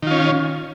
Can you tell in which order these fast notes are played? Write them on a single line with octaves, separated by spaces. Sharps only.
D#3 F4 C#4